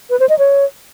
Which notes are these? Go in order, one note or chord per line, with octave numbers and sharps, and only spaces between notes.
B4
C5
D#5
C#5